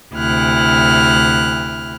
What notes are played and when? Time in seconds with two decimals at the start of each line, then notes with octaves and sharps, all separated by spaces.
0.14 D2 C3 E4 F6 F#6